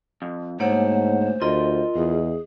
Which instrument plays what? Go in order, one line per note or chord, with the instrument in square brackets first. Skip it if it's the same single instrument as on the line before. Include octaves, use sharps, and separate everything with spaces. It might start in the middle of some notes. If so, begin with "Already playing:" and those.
[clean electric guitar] F2
[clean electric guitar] D2 [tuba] G#2 [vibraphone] A#3 C#5 F#5 [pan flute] C5
[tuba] D2 [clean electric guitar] F4 A#4 C6 [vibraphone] D#5
[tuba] E2 [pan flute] G#4